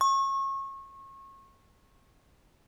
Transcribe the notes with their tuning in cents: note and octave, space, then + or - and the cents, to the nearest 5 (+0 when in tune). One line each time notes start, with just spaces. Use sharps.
C#6 -30